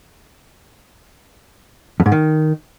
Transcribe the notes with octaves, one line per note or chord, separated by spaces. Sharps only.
F2
G#2
D#3